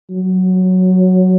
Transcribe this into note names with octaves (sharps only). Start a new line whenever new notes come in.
F#3